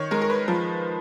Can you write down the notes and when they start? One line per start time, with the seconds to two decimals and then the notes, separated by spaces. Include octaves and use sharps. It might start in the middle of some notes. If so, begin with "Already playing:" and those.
Already playing: D#3 C#5
0.11 G#3 A#4
0.21 A#4
0.30 B4
0.48 F3